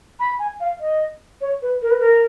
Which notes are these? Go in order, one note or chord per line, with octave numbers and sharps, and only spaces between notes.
B5
G#5
F5
D#5
C#5
B4
A#4
B4
A#4